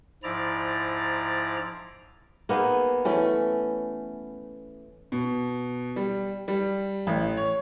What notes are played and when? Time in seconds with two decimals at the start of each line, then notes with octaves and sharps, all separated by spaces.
0.23 G#2 F3 E4 D5 A#5 A6
2.49 A#3 B3 D#4 G#4
3.05 E3 A3 C#4
5.12 B2
5.96 G3
6.48 G3
7.07 A1
7.37 C#5